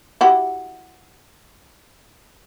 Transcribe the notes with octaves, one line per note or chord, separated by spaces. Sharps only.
E4 F#4 G4